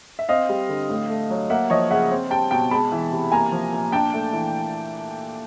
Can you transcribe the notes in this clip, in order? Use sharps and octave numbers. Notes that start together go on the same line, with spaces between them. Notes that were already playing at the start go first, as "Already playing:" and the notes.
E5
C4 D#5 F5
G3
D3
A2
A3
F#3
A#3 E5 F#5
F3 C#5 D#5
C#3 E5 F#5
C4
G3 G5 A5
B2 G5 A5
G#3 A5 B5
E3
C3
A#3 G#5 A#5
F3
A#2
D4 G5 A5
A3
E3